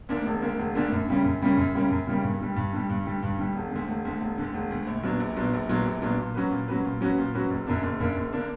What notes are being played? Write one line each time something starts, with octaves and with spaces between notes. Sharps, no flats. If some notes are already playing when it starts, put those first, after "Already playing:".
D2 D3 A#3 D4
E1
D2 D3 A#3 D4
E1
D2 D3 A#3 D4
F#2
C#3 G3 A#3 C#4
F#2
C#3 G3 A#3 C#4
F#2
C#3 G3 A#3 C#4
F#2
C#3 G3 A#3 C#4
G2
D3 G3
G2
D3 G3
G2
D3 G3
G2
D3 G3
E1
D2 D3
E1
D2 D3
E1
D2 D3
E1
D2 D3
A#1
A#2 F#3 B3 D4
A#1
A#2 F#3 B3 D4
A#1
A#2 F#3 B3 D4
A#1
A#2 F#3 B3 D4
A#2
F#3 C#4 F#4 B4
A#2
F#3 C#4 F#4 B4
A#2
F#3 C#4 F#4 B4
A#2
F#3 C#4 F#4 B4
F#1
F#2 D3 A#3 D4
F#1
F#2 D3 A#3 D4
F#1
D3 A#3 D4